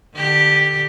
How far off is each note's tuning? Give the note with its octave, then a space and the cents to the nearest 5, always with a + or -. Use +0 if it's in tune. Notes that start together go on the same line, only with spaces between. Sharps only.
D3 +30 G4 +0